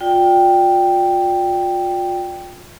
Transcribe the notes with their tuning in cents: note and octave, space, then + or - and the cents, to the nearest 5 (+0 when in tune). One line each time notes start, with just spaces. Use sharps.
F4 +30 D5 +5 G5 +0